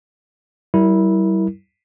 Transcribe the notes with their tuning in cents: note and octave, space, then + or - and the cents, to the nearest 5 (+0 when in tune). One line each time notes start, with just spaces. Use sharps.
G3 -40 E4 -15 A#4 +0